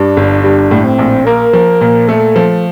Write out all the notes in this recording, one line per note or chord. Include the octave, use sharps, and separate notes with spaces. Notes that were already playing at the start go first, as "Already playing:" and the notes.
Already playing: G2 D4
G1
G3 D4
A2
C4
A#1
A#3 A#4
F3
A#2
A3 A4
F3